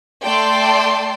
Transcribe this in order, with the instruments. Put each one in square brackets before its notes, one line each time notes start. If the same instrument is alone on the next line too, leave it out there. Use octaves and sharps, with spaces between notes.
[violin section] A3 D5 G5 A5 C6